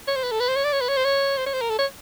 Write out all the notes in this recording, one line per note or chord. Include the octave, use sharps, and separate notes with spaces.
C#5
C5
B4
A4
B4
C5
C#5
D5
C#5
B4
C#5
C5
C#5
C5
C#5
C5
A#4
A4
C#5